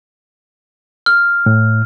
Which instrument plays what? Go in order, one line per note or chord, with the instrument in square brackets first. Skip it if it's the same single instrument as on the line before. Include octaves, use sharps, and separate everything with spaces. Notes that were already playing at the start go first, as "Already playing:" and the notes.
[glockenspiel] F6
[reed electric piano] A2